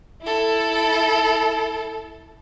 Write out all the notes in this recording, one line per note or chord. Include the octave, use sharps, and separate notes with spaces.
E4 A4